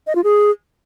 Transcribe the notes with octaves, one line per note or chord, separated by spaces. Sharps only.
D#5
F4
G#4